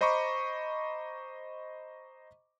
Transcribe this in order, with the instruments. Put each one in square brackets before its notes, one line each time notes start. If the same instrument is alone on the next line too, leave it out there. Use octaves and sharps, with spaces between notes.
[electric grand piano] C5 D#5 A#5 B5 C#6 D6